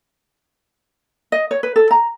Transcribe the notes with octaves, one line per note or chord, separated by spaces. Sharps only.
D#5
C#5
B4
A4
A#5